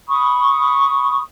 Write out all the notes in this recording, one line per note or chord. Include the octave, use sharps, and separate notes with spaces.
B5 C#6 D#6